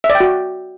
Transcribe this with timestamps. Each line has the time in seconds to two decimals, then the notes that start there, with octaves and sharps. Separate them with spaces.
0.04 E5
0.10 D5
0.15 G5
0.20 F#4